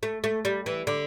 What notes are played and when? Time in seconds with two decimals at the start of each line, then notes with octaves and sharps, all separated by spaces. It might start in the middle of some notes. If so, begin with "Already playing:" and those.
0.03 A3
0.24 A3
0.45 G3
0.66 E3
0.87 D3